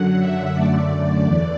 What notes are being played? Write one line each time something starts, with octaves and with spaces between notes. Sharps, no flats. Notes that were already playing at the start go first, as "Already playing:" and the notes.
Already playing: F#2 D3 F#3 F#5
E5
F#2 D3 A3 D5
E2 E3